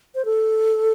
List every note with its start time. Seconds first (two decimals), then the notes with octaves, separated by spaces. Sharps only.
0.15 C5
0.25 A4